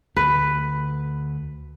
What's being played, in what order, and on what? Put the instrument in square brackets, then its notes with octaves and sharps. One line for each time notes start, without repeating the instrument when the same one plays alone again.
[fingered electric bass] D2 D3 [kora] B4